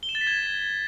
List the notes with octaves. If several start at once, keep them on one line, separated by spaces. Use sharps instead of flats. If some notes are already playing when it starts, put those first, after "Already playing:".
G7
E7
A6
B6
G#6